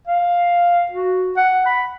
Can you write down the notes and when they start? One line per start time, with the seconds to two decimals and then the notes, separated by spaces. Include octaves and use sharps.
0.08 F5
0.92 F#4
1.37 F#5
1.66 B5